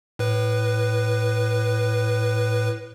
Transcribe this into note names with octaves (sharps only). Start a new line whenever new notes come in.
A2 B4